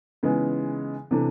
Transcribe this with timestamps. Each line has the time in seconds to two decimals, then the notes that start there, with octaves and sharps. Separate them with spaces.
0.23 C#3 E3 G#3 B3 D#4
1.11 C3 E3 A3 D4